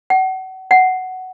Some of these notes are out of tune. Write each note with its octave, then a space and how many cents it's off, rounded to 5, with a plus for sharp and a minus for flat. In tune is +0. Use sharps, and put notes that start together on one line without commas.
F#5 +35
F#5 +10